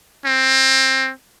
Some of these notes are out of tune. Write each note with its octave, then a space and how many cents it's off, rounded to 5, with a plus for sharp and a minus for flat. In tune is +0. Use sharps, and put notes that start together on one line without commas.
C4 +20